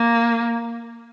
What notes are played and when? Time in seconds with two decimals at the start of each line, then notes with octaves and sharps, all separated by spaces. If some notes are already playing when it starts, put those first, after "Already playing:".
Already playing: A#3